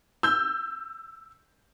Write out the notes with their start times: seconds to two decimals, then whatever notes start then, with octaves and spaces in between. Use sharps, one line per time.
0.23 E6 G6